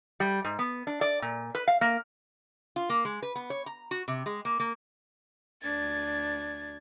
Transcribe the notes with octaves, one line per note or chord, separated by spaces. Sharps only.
G3
G#2
B3
D4
D5
A#2
B4
F5
A#3
F4
A#3
G#3
B4
B3
C#5
A#5
F#4
C3
G#3
A#3
A#3
D2 D4 G#6 A6